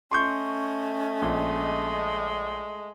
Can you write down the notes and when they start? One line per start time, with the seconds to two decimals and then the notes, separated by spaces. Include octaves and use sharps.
0.11 A3 C#4 D#5 C6 C#6 G6
1.22 A#1 G#3